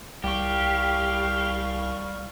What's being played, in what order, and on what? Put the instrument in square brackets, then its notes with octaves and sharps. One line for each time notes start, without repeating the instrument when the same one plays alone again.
[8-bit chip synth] C2 C#6 [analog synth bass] G3 [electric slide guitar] G4 [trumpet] F5